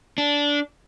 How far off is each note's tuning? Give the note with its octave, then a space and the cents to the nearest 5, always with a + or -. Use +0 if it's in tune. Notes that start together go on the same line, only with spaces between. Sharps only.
D4 -15